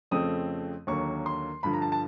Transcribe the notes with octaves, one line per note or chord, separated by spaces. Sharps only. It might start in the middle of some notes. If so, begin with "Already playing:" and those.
F2 C#3 F3 A3 C4 D#6
D#2 D3 F#3 A#3 C#6
C6
G2 D3 F3 B5
A#5
A5
A5